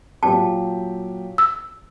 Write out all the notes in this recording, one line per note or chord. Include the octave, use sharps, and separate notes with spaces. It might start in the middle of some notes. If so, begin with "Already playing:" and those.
A#2 F#3 G4 A5
E6